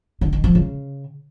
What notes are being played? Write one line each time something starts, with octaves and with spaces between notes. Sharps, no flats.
D3
D#3
F3
C#3